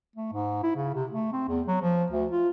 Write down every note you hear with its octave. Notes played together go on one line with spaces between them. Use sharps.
A3
G#2
E4
C#3
C3
A3
C4
E2
F#3
F3
D2
F4